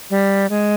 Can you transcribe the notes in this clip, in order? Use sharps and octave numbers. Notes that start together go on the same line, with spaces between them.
G3
G#3